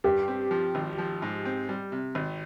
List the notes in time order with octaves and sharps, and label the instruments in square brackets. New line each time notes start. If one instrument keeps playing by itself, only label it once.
[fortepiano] G2 [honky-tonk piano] G4
[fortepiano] C4
F3
G#1
F3
G#2
C4
G3
C3
G#1